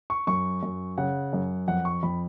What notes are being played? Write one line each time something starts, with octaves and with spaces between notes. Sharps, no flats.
C#6
F#2 C#6
F#2
C#3 F#5
F#2
F2 F#5
C#6
F2 B5